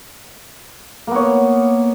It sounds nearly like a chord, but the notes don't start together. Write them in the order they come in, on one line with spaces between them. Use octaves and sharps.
A#3 B3 C#5